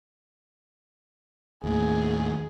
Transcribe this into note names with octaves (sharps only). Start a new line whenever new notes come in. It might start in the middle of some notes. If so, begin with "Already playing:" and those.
D#2 A2 G#4